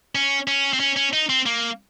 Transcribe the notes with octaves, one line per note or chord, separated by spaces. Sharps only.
C#4
C#4
C4
C#4
C#4
D#4
C4
A#3